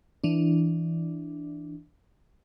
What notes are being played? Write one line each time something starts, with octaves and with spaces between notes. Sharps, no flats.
E3 D4